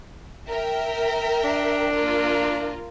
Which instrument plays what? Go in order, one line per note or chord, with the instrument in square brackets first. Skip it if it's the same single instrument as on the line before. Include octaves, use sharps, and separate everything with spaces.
[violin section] A#4 E5 G5
[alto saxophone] D4
[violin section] A#3 F4 A#4